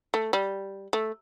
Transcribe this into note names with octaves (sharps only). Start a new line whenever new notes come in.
A3
G3
A3